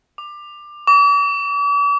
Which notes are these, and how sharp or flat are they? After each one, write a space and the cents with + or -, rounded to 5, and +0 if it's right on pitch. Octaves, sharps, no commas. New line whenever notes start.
D6 +20
D6 -45